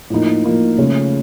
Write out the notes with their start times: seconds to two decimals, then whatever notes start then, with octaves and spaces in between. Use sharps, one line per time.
0.10 A2 F3 A#3 D#4
0.44 A2 F3 A#3 D#4
0.78 C#3 F3 A3 C#4 F4